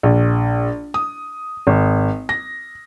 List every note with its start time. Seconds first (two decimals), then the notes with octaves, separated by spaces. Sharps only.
0.03 A#1
0.94 D#6
1.67 G#1
2.29 A#6